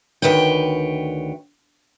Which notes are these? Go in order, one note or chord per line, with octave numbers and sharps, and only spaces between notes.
D2 D#3 B4 C#5 G5